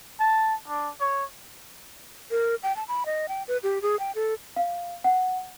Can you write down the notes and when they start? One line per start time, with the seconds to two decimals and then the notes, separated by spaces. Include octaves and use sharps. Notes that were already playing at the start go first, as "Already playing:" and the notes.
0.20 A5
0.68 D4
1.00 C#5
2.31 A#4
2.63 G5
2.76 A5
2.88 B5
3.06 D#5
3.29 G5
3.48 B4
3.63 G4
3.82 G#4
3.99 G5
4.15 A4
4.56 F5
5.04 F#5